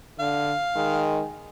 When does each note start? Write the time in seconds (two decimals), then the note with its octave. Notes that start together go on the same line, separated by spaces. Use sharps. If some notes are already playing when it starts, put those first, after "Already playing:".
0.19 D3 F5
0.76 D#3 G#3